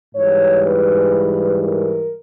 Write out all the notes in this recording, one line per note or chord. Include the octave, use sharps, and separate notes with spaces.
G#2 E3 G3 C#5
B4
A#4